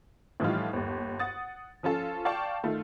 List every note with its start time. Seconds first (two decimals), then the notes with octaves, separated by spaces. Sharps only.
0.40 A2 E3 F3 G3 D#4 F4
0.73 G1 D#2
1.20 F#5 D#6 A6
1.83 F3 C#4 F4 A4
2.25 D5 F5 G5 A5 C#6 G6
2.63 D#3 A3 F4